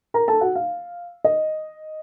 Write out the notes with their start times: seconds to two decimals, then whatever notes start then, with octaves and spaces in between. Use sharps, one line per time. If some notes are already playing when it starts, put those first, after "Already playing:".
0.14 A#4 A#5
0.28 A4 A5
0.41 F#4 F#5
0.55 F5
1.24 D#5